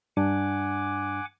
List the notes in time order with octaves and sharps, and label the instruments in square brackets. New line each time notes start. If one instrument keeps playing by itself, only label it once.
[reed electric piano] G2 D4 [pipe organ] F#5 G#5 D6